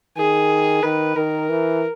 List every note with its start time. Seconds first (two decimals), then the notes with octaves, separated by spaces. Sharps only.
0.17 D#3 G#4
0.83 D#3 B4
1.16 D#3 A#4
1.49 E3